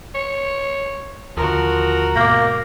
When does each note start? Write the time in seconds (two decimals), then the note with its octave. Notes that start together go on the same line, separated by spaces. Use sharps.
0.15 C#5
1.37 D#2 D3 F3 F#4 A#4
2.16 G#2 B2 A#3 D6 F6 A#6